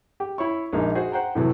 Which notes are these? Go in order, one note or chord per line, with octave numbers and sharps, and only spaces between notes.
G4
E4 C#5 C#6
A#1 G#3 A#3 D#4
F#4 G#4 C5
C5 F#5 G5 A#5
A2 C3 E3 F#3